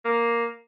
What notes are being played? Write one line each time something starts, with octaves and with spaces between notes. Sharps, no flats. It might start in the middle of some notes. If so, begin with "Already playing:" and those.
A#3